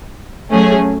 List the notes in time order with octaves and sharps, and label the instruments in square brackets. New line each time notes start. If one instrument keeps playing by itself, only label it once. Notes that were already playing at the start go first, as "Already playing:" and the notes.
[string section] F#3 A3 C#4 G#4